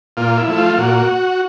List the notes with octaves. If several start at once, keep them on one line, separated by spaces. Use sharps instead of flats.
A#2 F4
E4
F3 A3
F4
A#2 F#4